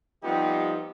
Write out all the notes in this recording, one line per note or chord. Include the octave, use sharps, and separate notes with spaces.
F3 G3 B3 C4 D#4 G4